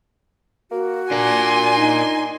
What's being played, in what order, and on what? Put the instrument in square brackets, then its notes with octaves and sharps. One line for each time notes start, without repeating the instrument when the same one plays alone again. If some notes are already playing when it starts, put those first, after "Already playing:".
[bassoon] A#3 [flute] F#4
[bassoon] D4 [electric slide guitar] F4 A#4 [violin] G#5 C6
[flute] D#4